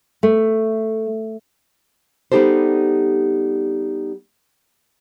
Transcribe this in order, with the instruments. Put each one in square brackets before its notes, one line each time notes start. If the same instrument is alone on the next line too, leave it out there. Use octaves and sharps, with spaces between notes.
[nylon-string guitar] A3
G3 B3 D#4 G4 A4 C5